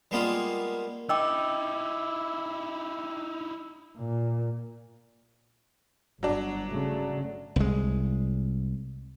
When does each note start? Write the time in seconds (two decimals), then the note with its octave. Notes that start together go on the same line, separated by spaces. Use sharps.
0.11 G3 G#3 A#3 B3 F4
1.09 D#4 E4 D#5 G5 D6 E6
3.98 A#2
6.23 G1 F#3 D4
6.71 C#3 A3
7.56 C2 G#3